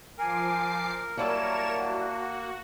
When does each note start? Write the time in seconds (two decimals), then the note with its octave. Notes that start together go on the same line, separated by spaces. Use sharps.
0.18 F3 A#4 G#5 D6 C7
1.17 F#3 G3 A#3 E4 A#4 C#5 A5 E7
1.76 F#4